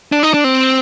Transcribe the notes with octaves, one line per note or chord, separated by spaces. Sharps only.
D4
D#4
D4
C4